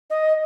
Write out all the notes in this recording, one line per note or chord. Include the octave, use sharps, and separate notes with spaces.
D#5